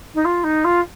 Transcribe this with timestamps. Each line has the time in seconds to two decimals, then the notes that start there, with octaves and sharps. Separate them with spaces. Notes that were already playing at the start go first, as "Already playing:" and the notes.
0.15 D#4
0.25 F4
0.44 D#4
0.65 F4